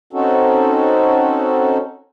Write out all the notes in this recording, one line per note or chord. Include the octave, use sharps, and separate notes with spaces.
C4 C#4 D#4 F#4 A4